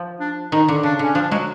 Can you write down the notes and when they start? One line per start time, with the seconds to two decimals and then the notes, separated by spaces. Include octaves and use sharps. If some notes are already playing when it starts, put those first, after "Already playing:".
Already playing: F3
0.20 D4
0.52 D#3 D#4
0.69 D3
0.83 C#3 D4
0.99 D3 C#4
1.15 F3 D4
1.31 F#3 G#3